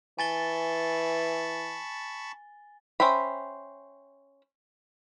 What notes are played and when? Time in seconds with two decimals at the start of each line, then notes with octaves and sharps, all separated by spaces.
0.19 E3 G#5 A5 B5 C#6 A6 G7
3.00 C#4 C5 E5 G5 B5